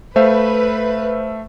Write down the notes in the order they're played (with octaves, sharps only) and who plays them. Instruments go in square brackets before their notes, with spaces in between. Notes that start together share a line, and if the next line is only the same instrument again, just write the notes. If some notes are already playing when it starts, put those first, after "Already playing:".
[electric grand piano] A3 E5 F5 [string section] B4 [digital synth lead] C5